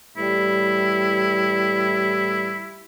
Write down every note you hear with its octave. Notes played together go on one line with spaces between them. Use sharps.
A2 E3 G3 E4